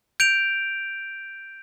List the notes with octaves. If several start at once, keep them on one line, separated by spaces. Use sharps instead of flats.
G6 D7 F7